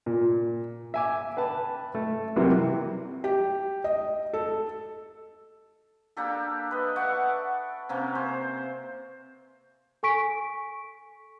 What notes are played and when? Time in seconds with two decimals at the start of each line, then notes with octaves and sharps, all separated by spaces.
0.06 A#2
0.94 E5 G#5 D6
1.37 B4 G5 A5 B5
1.95 A3
2.36 C3 E3 F#3 G3 A#3
3.24 G4
3.84 D#5
4.33 A4
6.17 A#3 D4 G4 A4
6.71 B4 D#5
6.96 D5 E5 F#5 C#6
7.89 C3 A#3 C#4
8.15 C5
10.03 A4 G#5 C#6 B6 D7